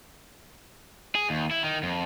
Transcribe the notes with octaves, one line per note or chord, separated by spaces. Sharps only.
G#4
D#2
E4
D#3
F2